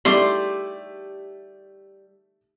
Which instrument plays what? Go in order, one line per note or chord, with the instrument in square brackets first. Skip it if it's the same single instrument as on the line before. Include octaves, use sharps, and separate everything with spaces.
[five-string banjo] G3 [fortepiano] A3 E4 D5 [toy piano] D#4 G4 G#4 [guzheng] C6